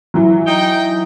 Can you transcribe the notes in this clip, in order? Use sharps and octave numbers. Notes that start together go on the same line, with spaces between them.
E3 F#3
D#4 G5